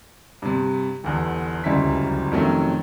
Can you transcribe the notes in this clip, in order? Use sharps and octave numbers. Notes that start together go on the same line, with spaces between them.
G2 C3
G1 E2 D3
D1 C#2 F#2 G3 E4 B6
F2 C3 D#3 F#3 A3 C#4